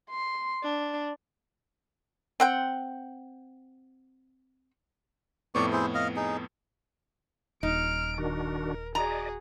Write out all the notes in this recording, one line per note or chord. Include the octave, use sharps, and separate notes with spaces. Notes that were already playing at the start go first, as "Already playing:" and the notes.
C6
D4
C4 F#5 G5
F2 A2 B3 D5 C#6
E4 G#4 C5
D#5 F5
D#4 G#4
D#1 D#4 F6 D7
D#3 D4 F#4 A#4
F#4 G#4 D5 D#5 A#5